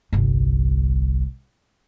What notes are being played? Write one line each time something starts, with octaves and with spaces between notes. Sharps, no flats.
G1 C2